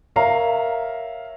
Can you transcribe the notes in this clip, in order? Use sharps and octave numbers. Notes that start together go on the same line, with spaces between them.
A#4 C#5 E5 F5 A#5